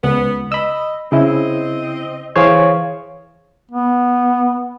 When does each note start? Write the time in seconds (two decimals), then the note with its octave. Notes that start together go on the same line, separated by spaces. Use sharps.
0.04 C#2 B3
0.52 D#5 B5 E6
1.12 C#3 C4 E4 D#5
2.36 E3 G#4 C5 C#5 F5
3.71 B3